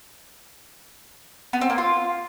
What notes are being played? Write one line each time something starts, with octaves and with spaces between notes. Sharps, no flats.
B3
C4
A#3
F4